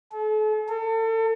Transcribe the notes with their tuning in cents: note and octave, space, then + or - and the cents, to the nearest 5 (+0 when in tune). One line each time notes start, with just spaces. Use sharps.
A4 -40
A4 +35